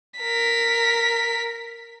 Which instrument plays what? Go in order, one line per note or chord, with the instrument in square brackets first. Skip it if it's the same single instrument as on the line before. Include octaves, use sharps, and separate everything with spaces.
[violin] A#4 B6